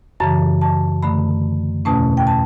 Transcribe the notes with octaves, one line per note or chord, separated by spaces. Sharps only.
F#2 C#3 E3 A5
A5
F#2 D3 A3 B5
E2 B2 A3 C#4 A5
G5
A5